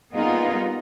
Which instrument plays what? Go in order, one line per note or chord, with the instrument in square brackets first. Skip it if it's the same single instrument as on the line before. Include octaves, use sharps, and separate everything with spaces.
[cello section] G3 A#3 B3 D#4 F4 G#4